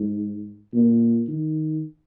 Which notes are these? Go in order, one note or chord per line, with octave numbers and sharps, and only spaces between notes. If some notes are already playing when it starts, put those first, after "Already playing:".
Already playing: G#2
A#2
D#3